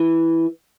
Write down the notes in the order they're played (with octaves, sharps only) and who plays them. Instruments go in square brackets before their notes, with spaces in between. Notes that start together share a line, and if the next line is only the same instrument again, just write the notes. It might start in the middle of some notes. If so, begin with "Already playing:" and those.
Already playing: [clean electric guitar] E3